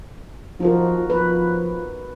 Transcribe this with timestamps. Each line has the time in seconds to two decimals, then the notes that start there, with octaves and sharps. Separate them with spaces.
0.60 F3 D#4 F#4 A#4
1.10 F3 B4